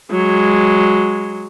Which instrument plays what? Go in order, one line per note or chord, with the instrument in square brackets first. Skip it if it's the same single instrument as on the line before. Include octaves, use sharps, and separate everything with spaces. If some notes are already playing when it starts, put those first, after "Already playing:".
[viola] F#3 G#3